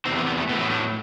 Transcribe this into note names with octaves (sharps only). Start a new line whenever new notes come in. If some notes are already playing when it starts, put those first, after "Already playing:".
E2 C3 E3 C4
B3
B3
A3
A2 F#3 B3
B3
A3